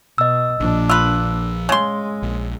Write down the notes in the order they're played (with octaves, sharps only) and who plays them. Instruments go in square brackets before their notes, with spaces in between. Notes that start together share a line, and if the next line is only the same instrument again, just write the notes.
[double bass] B2 [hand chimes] D#5 E6
[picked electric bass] A#1 F3 [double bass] A#2 D4
[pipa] F4 B4 [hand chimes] E6
[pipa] C#3 C6 [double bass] G#3
[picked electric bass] A#1